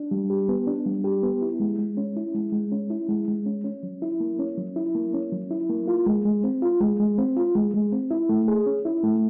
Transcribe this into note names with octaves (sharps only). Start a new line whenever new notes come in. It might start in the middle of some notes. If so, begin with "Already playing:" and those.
Already playing: D4
G3
G4
B3
D4
G3
G4
B3
E4
G#3
G#3
C#4
E4
G#3
G#3
C#4
E4
G#3
G#3
C#4
C#4
F#3
E4
A#3
C#4
F#3
E4
A#3
C#4
F#3
E4
A#3
F4
G#3
G#3
C4
F4
G#3
G#3
C4
F4
G#3
G#3
C4
E4
A3
G#4
C#4
E4
A3